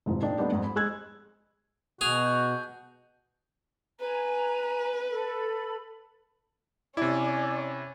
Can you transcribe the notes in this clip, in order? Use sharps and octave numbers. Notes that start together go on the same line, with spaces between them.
F1 G#2 F3
A#2 D4 D#4 G5
G3 A3 B3 D4 D#4 G4
F2 G#2
B5
G#3 G#4 E6 F#6 G#6
B2 F#4 G#4 F7
G6
B4 G#5 A#5
A4 B5
C3 C#4 E4 D5